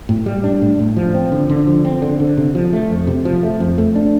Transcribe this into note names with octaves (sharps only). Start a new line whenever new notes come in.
A2
G3
D4
A2
A2
F3
C4
D3
D3
F3
C4
D3
D3
C3
F3
A3
F2
C3
F3
A3
F2
A3
D4